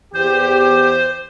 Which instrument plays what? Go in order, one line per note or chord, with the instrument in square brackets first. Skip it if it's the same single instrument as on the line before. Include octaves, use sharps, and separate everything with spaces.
[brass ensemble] E2 G4 [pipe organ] C5